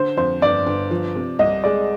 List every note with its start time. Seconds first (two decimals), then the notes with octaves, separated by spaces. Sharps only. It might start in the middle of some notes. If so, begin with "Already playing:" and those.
Already playing: D3 C5
0.17 F2 C5
0.42 G1 D5
0.66 G1
0.91 F3
1.15 C3
1.39 C2 D#5
1.64 G#3 D5